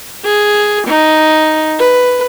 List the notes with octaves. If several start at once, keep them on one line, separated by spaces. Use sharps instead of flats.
G#4
D#4
B4